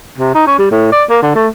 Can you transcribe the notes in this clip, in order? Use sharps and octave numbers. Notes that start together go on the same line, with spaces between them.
C3
D#4
C#4
G3
A2
D5
A#3
D3
A3